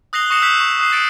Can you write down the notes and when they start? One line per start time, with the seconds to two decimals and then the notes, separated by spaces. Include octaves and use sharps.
0.13 D#6 F#6 A#6 C7 F7 G7
0.30 C#6 D#6 A#6 C#7 E7
0.42 E6 F#6 G6 B6 F7
0.60 C#6
0.79 D#6 F#6 C7
0.92 A6 C#7 D7